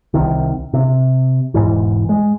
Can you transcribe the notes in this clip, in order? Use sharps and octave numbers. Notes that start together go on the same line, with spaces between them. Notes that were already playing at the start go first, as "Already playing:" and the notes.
C2 C3 D#3
C3
E1 G#2 E3
G#3